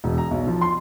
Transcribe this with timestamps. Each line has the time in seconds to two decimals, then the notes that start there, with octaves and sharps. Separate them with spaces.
0.04 E1
0.18 A#5
0.31 B1
0.47 F3
0.61 C6